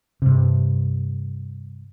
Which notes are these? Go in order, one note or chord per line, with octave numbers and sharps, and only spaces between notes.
G2 C3